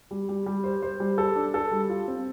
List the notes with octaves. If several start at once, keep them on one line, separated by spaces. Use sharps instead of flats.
G3
G3
G3
C5
C5
G3
A4
D4
A4
G3
F4
C4